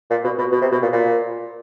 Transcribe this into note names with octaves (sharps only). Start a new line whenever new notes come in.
A#2
B2
B2
B2
C3
B2
A#2
A#2